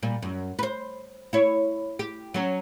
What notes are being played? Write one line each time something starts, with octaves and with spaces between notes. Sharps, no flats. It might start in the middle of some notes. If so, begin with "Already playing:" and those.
A#2 G3
F#2
B4 C5
E4 C#5
G4
F#3 C#4